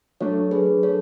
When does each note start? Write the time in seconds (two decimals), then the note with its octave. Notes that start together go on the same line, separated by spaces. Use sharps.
0.21 F#3 A3 D4 A4 C#5
0.51 G#4 B4
0.83 A4 C#5